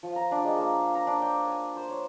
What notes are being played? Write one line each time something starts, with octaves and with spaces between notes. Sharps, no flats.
F3
A#5
D4
G#3
A#3
F5
A#5
D4
G5
G#5
C5
C#5